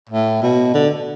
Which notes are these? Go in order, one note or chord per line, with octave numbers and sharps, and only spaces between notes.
A2
B2
D3